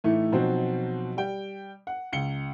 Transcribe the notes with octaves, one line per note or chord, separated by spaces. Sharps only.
A2 E3 A3 D#4 E4
B2 F3 F#3 C4 D#4 F#4
G3 G5
F#5
C#2 C#7 G7